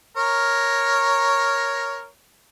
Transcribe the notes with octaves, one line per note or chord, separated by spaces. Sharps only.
A#4 C#5